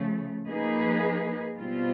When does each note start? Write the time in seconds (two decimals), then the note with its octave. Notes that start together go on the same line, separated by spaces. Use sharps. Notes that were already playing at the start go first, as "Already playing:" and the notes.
Already playing: C#3 F3 A3
0.48 F3 A#3 D#4 G#4 B4
1.59 B2 G3 C4 F4